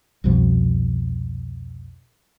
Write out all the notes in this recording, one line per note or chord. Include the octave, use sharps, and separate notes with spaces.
C2 F2 B2 F3